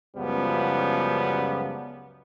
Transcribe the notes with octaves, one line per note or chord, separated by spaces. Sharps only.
C#2 F#2 F3 G3 B3